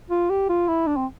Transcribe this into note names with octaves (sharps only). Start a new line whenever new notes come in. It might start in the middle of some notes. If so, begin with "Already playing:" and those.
F4
G4
F4
E4
D4
C4